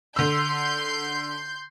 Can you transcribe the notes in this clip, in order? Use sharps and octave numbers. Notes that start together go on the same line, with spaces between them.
D3 C6 E6 G6